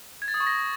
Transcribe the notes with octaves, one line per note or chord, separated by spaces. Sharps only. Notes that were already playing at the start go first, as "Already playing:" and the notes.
G#6
A6
D#6
C#6
A#6